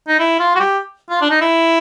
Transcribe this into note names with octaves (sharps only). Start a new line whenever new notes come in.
D#4
E4
F4
F#4
G4
F4
D4
D#4
E4